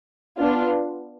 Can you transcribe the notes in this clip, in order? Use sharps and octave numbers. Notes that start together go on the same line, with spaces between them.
B3 D4 F4